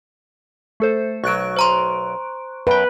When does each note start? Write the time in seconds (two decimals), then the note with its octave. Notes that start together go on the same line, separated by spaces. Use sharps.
0.80 A3 A4 C5
1.24 B1 F#3 C#6 F#6 D7
1.57 C5 A#5 C6
2.67 F#2 B4 G5